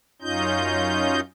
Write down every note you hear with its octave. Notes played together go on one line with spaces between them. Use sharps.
F#2 C#4 D#4 F4 D#5 G6